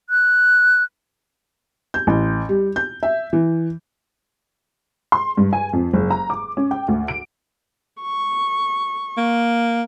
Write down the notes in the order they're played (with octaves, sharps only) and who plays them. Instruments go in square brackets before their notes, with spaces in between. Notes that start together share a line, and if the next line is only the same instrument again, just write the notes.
[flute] F#6
[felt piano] G6
A1
G3
G6
E5
E3
[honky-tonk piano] C6
G2
G#5
F2
F#1
A#5
D6
C#4
G5
D2
D7
[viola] C#6
[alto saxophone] A#3